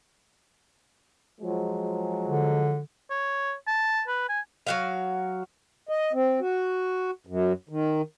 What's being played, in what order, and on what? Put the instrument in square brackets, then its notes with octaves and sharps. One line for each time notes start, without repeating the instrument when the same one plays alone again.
[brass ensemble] F3 F#3 G#3
[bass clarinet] D3
[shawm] C#5
A5
B4
G#5
[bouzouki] F#3 F#4 F5
[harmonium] D#5
C4
F#4
F#2
D#3